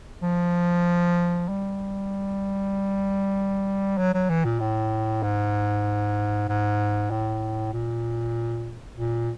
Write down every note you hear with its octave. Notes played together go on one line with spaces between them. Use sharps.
F3
G3
F#3
F#3
E3
A#2
A2
G#2
G#2
A2
A#2
A#2